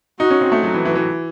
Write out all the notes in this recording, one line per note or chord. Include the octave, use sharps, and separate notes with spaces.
D#4 F#4
C#4
C4
A3
F#3 F#4
E3
E3
E3